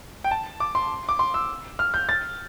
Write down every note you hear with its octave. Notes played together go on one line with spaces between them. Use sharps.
G5
A5
D6
C6
D6
C6
E6
F6
G6
A6